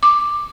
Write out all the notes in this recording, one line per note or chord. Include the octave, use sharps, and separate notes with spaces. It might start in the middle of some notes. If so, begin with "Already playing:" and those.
D6